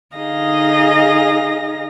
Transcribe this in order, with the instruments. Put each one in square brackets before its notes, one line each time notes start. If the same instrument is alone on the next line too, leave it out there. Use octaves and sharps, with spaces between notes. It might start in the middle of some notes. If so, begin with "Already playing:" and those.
[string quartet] D3 D#4 G#4 D#5 F5 A#6